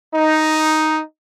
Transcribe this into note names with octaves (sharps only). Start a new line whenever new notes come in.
D#4